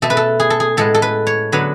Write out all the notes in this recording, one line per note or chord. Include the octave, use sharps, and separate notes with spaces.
B2 A3 A4
B4
A4
G#4
A4
G#4
A2 G#3 B3 A4
A4
B4
C#5
D3 F#3 B3 B4